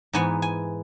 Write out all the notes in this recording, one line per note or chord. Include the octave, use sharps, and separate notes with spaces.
G#2 E3 B3 G#5
G#5